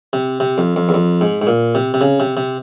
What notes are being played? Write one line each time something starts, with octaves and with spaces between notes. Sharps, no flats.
C3
C3
F2
F2
E2
F2
G#2
G#2
A#2
C3
C3
C#3
C3
C3